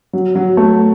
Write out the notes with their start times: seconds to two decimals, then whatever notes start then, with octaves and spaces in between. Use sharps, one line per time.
0.13 F#3
0.35 F#3
0.57 A3